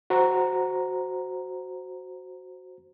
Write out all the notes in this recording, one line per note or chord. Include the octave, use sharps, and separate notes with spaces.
F#4 C5 A#5